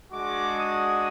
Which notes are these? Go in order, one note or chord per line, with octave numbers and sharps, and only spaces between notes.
G#3 D4 F#4 D6
D#6